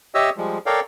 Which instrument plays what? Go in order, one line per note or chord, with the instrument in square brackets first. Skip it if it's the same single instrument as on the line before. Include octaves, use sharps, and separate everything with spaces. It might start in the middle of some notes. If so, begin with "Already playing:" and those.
[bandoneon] G4 C#5 D#5 E5 E6
F3 G3 G#3
A4 A#4 C#5 D5 F5 G5